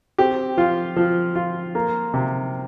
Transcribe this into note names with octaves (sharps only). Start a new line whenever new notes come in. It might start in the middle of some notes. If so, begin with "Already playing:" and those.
C4 G4
F3 F4
F3
F4
A#3
C3